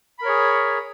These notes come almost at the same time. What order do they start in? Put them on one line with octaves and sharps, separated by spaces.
B5 A#4 C#5 G#4